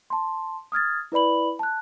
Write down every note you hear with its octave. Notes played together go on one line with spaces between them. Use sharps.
A5 C6
D#6 F6 G#6 A6
E4 B4 D5 B5 F#7
A5 F#6